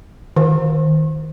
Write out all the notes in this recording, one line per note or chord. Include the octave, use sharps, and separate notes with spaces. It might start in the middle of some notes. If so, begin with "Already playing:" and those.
D#3